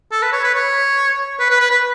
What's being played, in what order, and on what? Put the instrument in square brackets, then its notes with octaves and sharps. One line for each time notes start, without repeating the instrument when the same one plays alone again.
[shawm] A4
B4
C#5
B4
C#5
B4
B4
B4
B4